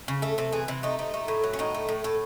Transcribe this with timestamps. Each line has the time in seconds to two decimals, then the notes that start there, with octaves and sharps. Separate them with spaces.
0.08 C#3
0.22 A3 A4
0.38 C3 A4
0.52 E3 G#4
0.68 C3 E4
0.83 A3 D#4
0.99 C3 D#4
1.14 A3
1.28 A2
1.43 F#3
1.53 C#4
1.59 A2 D#4
1.74 A3
1.89 A2
2.04 A2 A4